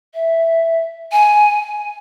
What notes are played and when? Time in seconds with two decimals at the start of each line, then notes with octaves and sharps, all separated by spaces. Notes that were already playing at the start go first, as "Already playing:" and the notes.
0.14 E5
1.12 G#5